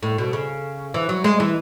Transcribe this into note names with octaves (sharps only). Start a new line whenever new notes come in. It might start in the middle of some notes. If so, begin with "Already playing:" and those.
A2
B2
C#3
E3
F#3
G#3
E3